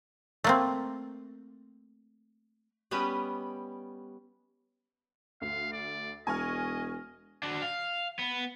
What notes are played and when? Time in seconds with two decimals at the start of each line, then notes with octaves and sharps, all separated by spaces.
0.44 A3 A#3 C4
2.91 G3 B3 C#4 G4 B4 D#5
5.41 D2 F5
5.72 D5
6.27 E1 D#5 G#5 C#6 F6
7.43 D4 F#4
7.62 F5
8.19 B3